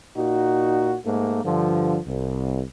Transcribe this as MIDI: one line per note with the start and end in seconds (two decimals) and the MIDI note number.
0.16 0.96 46
0.16 0.96 63
0.16 0.96 66
1.05 1.39 44
1.05 1.39 57
1.05 1.39 58
1.44 1.99 43
1.44 1.99 50
1.44 1.99 53
2.05 2.62 36